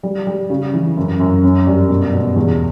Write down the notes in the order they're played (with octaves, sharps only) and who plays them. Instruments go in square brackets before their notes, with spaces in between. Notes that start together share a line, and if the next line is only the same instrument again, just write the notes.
[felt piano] G3
G3
C#3
E3
F#2
F#2
C#4
G2
B2
B2
E2